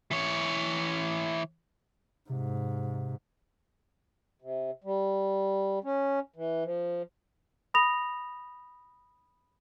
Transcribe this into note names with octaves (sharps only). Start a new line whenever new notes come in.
E3 C#5
G#2 C3
C3
G3
C#4
E3
F3
B5 D#6 A#6 F7